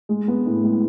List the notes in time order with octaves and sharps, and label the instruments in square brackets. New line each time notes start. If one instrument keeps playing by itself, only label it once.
[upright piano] G#3
B3
A2
G#3